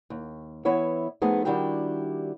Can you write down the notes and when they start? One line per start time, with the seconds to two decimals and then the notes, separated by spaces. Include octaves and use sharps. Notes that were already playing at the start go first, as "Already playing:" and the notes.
0.10 D#2
0.65 E3 B3 E4 C#5 E5
1.22 F3 A3 B3 D#4 G#4
1.45 D#3 G3 D4 E4 F#4 G4